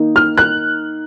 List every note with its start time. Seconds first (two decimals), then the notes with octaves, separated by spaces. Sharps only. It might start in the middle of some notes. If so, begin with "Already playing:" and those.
Already playing: D#3 A#3 D#4
0.16 F6
0.37 F#6